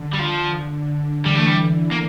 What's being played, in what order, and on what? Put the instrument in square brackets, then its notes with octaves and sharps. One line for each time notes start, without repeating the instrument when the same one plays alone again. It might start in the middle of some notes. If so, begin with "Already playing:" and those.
Already playing: [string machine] D3
[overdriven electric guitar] G3
F3
[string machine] E3 [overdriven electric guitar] G3
[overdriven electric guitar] A3
G3
A#3